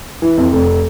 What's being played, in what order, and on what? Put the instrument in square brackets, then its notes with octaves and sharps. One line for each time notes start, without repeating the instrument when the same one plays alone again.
[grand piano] E3
F2
F1